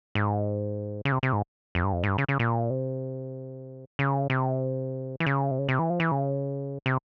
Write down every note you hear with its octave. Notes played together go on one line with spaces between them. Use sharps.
G#2
C#3
C3
C3
G#2
F2
G2
F2
G#2
G2
C#3
C#3
A#2
C3
C#3
C3
E3
C#3
C3
C#3
C3
E3
F3
E3
C#3
C3